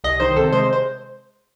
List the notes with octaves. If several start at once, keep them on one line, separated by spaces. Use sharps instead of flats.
C2 D#5
D#3 C5
C3 A4
G#3 C5
C5